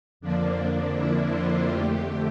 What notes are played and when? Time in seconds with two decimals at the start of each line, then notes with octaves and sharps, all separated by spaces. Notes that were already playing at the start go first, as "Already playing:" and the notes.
0.20 F2 D3 F3 A#3 D4
0.94 E4
1.30 F4
1.67 F2 D3 A3 G4